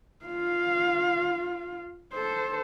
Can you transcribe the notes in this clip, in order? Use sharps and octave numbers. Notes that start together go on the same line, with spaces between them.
F4 F5
A4 C5